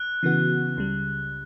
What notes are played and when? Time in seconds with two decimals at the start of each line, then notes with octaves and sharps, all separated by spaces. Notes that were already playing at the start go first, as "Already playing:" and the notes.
Already playing: F#6
0.23 C#3 E3 B3 F#4
0.77 C#2 C#3 G3